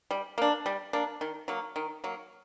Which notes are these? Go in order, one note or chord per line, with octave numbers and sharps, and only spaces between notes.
G3
A#3 D4
G3
A#3 D4
D#3
F#3 A#3
D#3
F#3 A#3